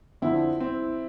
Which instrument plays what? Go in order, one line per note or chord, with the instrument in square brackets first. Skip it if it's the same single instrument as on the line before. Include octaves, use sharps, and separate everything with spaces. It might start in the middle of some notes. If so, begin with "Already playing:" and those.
[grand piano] F2 D3 F3 C4 [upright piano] E4
[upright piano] C4